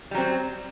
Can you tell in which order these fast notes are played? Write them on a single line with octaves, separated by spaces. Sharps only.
G3 F#3 C4